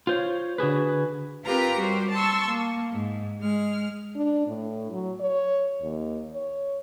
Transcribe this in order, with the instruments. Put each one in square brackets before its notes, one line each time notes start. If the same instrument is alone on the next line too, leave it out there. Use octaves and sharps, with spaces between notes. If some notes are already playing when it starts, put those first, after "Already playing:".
[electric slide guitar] F4 C5 C#5
D3 F#4 G#4 B4
[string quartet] C4 F4 G4 A#4 B4 A#5
G3 F#4 A#4 C5
A5 C6 C#6 E6
A#3
G#2
G#3 F6
[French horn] D4
A2
F#3
C#5
D#2
C#5